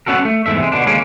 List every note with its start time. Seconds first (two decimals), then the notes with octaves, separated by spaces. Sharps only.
0.06 B3 C#4 F#4 A4 A#4
0.25 A3
0.46 E2 G#2 D#3 A3 E5
0.60 C3 G#3
0.72 B2 D3 D4
0.86 D#2 C#3 G#3 A#3 C#4